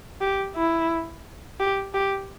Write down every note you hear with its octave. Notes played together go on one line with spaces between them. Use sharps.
G4
E4
G4
G4